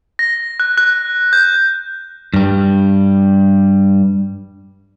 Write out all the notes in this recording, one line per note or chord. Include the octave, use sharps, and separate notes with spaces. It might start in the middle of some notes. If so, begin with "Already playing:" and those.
A#6
F#6
F#6
G6
G2 G3